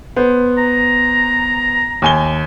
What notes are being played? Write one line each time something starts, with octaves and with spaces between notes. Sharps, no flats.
B3 C5
A#5
D#2 G#5 G7